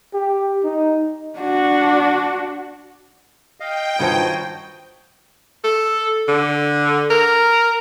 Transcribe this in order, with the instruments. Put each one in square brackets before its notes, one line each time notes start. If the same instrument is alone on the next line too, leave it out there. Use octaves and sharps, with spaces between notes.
[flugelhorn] G4
D#4
[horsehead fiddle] D4 F#4
[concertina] D#5 F5 [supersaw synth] G5
[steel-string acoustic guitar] G2 D#3 C5 [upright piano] F4 A5 [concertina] F#4 C#5 D#6
[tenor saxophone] A4
D3
A#4